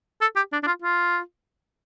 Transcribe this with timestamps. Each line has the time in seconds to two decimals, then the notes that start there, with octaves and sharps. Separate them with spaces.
0.21 A4
0.36 G4
0.52 D4
0.63 D4
0.67 F4
0.82 F4